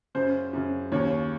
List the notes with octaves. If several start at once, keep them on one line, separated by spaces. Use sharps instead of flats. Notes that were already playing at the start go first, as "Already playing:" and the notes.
F#2 C#3 C5
F#2 C#3
D#2 C#3 C#5